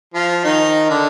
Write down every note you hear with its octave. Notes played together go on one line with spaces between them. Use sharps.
F3 F4
D#3 D#4
D3 D4